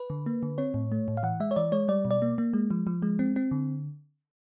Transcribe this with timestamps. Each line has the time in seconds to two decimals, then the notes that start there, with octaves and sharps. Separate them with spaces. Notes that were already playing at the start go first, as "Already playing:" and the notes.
Already playing: B4
0.10 D3
0.26 A#3
0.43 D3
0.58 C4 C#5
0.74 A2
0.92 A3
1.08 A2
1.17 F5
1.23 E3 F#5
1.40 G#3 E5
1.51 C#5
1.56 E3 D5
1.72 G#3 C#5
1.88 G3 D5
2.05 B2
2.11 D5
2.22 A#3
2.38 A#3
2.53 G#3
2.71 F3
2.87 F3
3.02 G#3
3.19 C4
3.36 C4
3.51 D3